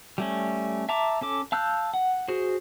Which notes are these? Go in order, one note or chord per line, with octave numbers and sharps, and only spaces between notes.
G3 A3 C#4
E5 A5 A#5 D6
C#4 A4 D6
F5 A5 E6 F#6 G6
F#5
F#4 G#4 C5